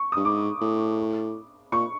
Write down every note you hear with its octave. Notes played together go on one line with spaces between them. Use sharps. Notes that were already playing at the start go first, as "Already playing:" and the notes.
Already playing: C#6
G2 D#6
G#2 D6
A2
A#2 C#6